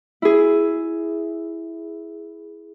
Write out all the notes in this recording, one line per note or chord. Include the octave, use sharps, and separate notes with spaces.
E4 G#4